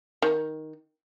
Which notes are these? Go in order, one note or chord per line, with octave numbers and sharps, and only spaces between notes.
D#3